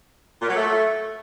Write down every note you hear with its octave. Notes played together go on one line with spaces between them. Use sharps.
A#2
F#3
A3